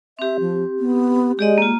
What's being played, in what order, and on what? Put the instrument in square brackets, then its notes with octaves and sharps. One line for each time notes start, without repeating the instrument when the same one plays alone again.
[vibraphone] C4 G4 [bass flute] E5
[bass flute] F3
B3
[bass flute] G#3 [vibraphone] G4 D5 D#5
[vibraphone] A#3 F4